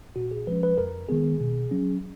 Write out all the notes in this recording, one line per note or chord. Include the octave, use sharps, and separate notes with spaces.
A#2 F#4
G#4
F3 G#3 C#4 B4
B4
F2 A#4
D#3 G#3 B3 G#4
B2
F#3 C#4